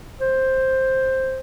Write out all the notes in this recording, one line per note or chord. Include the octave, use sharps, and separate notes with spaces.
C5